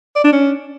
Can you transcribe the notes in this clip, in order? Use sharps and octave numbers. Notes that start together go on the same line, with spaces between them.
D5
D4
C#4